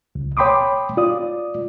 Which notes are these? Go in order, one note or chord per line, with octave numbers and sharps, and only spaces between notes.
C#2
C#5 G5 B5 C6 D6 D#6
F4 D5 D#6